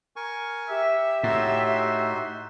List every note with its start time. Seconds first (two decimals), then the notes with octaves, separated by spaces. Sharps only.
0.16 A#4 G#5 C#6
0.69 G4 E5
1.23 A2 D#4 F#4 C6